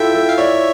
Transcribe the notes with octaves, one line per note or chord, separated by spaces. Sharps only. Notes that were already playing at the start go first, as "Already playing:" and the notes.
Already playing: E4 F4 A4 E5 G5
A4
F5
C#5 D5 E5